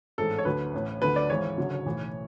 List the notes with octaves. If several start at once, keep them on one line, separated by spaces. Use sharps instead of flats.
A1 G#2 E3 A4
C#5
D2 D3 F#3 B4
A1 A2 E3
D2 D3 F#3 B4
D5
G#1 G#2 E3 C#5
F#1 F#2 D3 F#3
B1 A2 E3